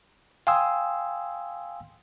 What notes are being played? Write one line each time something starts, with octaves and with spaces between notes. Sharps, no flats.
F5 G5 G#5 C6 D#6 E6